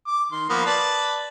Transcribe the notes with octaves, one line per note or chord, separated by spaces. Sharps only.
D6
D#3 C6
F3 A#3 B3
B4 D5 A5